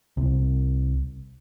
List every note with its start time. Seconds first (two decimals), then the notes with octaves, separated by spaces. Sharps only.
0.17 C2